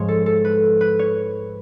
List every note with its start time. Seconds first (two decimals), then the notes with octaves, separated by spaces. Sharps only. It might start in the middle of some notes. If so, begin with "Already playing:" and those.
Already playing: G#2 F3 G#3 C#5
0.08 A4
0.26 A4
0.44 B4
0.81 B4
0.99 C#5